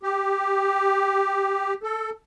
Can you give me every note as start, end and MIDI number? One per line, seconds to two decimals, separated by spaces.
0.03 1.74 67
1.83 2.10 69